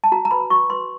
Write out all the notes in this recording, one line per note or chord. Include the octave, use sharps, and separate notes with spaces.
A5
F#4 A#5
A#5
B4 B5
F#4 C#6
B4 C6